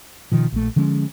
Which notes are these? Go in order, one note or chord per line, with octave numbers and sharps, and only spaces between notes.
B2 D#3 F3
A#1 A3
D3 F3 G#3 C#4